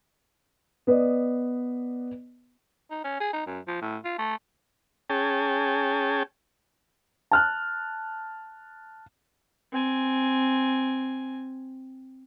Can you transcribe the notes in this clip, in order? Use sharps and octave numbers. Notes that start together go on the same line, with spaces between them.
B3 B4 D5 D#5
D#4
C#4
G#4
D#4
F#2
F3
A2
F4
A3
C#4 G#4 G5 A5
A5 F6 F#6
C4 G#5